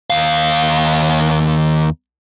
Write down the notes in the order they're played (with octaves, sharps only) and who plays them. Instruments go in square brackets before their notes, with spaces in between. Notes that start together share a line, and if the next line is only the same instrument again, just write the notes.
[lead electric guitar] D#2 F5